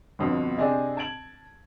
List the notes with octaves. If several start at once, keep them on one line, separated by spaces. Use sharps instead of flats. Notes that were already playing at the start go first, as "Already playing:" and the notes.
G1 F2 B2
C3 C4 D4 G#4 D#5
A5 G#6 D7 F#7